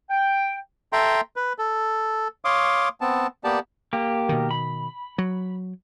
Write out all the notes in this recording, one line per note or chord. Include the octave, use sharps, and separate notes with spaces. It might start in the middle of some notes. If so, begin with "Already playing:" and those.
G5
A4 E5 G5 A#5 C6
B4
A4
C#5 F5 C6 D6 D#6
B3 C4 A5
A#3 B3 G4 D5 A5
A#3 G4
B2 D#3
B5
F#3